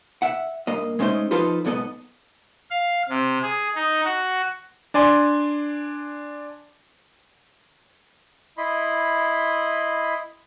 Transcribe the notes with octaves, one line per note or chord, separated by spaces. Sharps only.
E5 F#5
G2 A#2 A#3 D#5
G#3 A3 C#4 D#4 C5
F3 D#4 F4 A4 B4 C5
B1 G#2 B3 A4 D#5
F5
C3
G#4
D#4
F#4
D4 D5 G#5 C6
E4 D#5 B5 C6